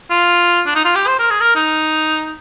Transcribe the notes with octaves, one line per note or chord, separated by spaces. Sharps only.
F4
D4
D#4
F4
G4
C5
A#4
G#4
A#4
D#4